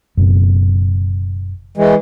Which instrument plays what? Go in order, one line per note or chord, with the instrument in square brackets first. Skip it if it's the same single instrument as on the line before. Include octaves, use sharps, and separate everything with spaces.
[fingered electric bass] F#1 F#2 B2
[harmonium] E3 G#3